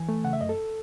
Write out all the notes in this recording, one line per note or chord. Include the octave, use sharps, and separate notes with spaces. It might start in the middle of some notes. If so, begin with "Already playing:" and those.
Already playing: E3 G#5
A3
C#3 F#5
E5
F#2 D#5
A4